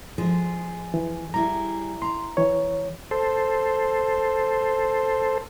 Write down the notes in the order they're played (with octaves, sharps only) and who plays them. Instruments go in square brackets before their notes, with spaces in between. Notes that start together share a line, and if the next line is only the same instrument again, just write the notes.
[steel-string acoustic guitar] F3 G#3 G#4
[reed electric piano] E3
[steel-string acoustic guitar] G3 E4 G#4 [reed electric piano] A#5
[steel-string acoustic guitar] A#5 [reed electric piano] C6
[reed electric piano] E3 C#5
[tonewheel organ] A4 C5